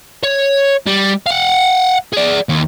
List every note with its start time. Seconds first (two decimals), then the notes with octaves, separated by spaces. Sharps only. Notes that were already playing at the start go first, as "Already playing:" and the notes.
0.24 C#5
0.87 G3
1.27 F5 F#5
2.13 G#4 D5
2.49 D#2